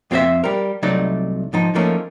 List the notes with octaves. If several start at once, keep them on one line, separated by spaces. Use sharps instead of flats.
F2 C4 G4 A4 C5 E5
G3 A#4
C2 F#3 A3 D#4 D5
G#2 F3 D#4
F3 A3 A#3 C#4 D#4